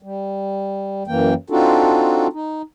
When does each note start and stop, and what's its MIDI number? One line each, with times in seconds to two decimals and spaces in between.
0.03 1.03 55
1.07 1.34 42
1.07 1.34 52
1.07 1.34 58
1.07 1.34 79
1.50 2.27 60
1.50 2.27 62
1.50 2.27 63
1.50 2.27 65
1.50 2.27 66
1.50 2.27 69
2.33 2.62 63